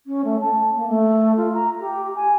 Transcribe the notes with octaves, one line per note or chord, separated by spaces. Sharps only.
C#4
A3
A5
A#3
A3
F4
A#5
G4
G#5